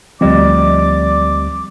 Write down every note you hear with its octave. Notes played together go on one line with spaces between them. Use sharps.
D2 F3 G3 C4 D5 D#5 D6